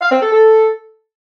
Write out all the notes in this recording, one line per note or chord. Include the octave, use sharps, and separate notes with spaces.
F5
C4
A4
A4